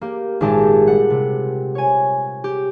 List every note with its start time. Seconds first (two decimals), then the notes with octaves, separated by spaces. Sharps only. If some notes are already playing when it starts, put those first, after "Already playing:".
0.01 A#3 G4
0.41 G#1 A#2 G#3 G4 A5
0.87 G3 F#5
1.10 C3
1.75 C#5 G#5
2.44 G4